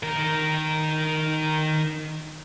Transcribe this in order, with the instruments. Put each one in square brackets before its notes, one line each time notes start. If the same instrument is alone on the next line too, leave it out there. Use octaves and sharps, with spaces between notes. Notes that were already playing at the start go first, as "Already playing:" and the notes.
[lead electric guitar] D#3 A#4